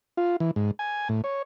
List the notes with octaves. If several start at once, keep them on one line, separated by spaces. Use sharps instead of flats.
F4
E3
G#2
G#5
A2
C#5